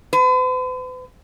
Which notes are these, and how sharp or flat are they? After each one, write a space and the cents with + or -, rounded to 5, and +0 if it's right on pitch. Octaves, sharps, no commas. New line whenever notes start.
B4 +45